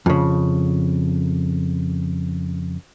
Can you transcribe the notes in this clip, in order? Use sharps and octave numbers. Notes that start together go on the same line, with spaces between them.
F2 C#3